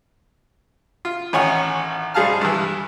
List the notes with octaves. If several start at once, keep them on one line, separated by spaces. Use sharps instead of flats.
F4
A1 D#3 C#5 F#5 G#5
G#2 G3 G#4 F5 A5 F6
G2 E3